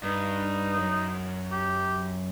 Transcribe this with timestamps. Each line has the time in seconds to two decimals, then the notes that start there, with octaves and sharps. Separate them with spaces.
0.03 G2 D#4
0.77 F#2
1.52 G4